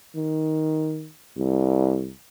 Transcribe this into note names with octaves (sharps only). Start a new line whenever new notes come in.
D#3
C2